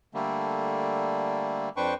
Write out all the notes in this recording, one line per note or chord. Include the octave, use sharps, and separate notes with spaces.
D3 G3 A3 A#3
F2 D4 B4 C5 G5 C#6